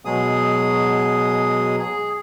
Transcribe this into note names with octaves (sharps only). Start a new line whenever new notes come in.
B2 F#3 G#3 G#4 D#6
G#4